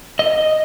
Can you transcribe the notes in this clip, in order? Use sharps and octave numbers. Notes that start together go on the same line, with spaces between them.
D#5